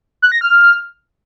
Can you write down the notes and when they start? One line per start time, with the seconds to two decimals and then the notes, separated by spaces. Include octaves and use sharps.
0.22 F#6
0.32 A#6
0.41 F6